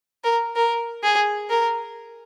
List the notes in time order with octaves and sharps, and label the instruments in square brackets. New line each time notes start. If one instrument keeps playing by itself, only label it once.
[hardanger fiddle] A#4
A#4
G#4
A#4